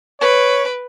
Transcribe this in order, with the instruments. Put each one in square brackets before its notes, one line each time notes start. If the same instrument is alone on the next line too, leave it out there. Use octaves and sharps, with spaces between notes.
[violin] B4 D7 [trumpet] C#5